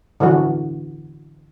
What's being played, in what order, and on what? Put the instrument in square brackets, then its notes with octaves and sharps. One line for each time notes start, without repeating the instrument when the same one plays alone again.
[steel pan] D3 E3 F#3 F#4